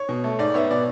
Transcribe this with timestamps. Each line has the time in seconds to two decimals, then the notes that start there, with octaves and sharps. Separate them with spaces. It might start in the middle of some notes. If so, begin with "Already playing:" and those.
Already playing: C#5
0.09 B2
0.24 A3
0.39 G#2 D5
0.54 B3 C#5 E5
0.71 B2 D5